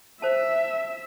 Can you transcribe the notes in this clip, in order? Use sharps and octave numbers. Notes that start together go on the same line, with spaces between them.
C5 E5 A5